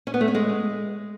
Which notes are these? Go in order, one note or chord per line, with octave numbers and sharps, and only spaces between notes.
C#4
B3
A3
C#4
G#3